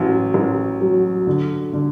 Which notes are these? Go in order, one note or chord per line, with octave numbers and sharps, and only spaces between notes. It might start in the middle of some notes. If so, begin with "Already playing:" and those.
Already playing: A1 F#3
A1
F#3
D3
D3